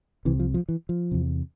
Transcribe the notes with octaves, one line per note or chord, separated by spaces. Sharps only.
C2 C3 E3
F3
F3
E3
F3
E2 C3